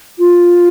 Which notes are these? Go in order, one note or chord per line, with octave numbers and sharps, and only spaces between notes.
F4